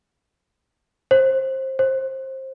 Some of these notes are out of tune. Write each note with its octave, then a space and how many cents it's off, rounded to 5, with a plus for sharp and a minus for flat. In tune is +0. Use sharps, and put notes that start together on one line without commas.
C5 +20
C5 +20